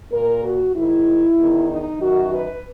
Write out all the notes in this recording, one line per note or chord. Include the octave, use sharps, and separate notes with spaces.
A#2 A#4
F#4
G#2 D#3 E4
E2 D#3
D#4
F#2 D#3 F#4
B4